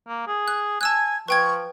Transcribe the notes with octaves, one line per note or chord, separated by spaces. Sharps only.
A#3
G#4
F#6
G#5 A5 E6 F#6 G#6
F3 B4 G5 C#6 G#6